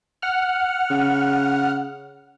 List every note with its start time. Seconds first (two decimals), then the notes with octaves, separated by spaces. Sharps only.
0.22 F#5 F6
0.90 C#3